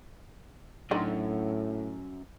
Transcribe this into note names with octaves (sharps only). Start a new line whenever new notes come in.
F#2 A2 D3 D#3